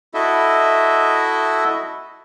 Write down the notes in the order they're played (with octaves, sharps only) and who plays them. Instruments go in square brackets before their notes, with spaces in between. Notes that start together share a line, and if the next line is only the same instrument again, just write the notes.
[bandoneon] E4 F#4 A4 D#5 E5